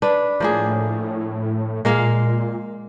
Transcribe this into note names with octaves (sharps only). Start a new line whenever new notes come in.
D4 B4
A2 F3 A#3 G#4
A#2 G#3 A#3 F5